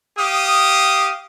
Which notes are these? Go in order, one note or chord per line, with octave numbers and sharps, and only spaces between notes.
G4 F5 D#6